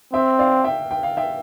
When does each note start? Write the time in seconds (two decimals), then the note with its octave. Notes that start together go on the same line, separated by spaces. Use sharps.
0.13 C4 E5 G5
0.39 D5 F5
0.64 E5 G5
0.91 G5
1.03 F5
1.17 E5 G5